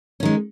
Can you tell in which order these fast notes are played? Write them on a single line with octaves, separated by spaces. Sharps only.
C#4 D#3 G#3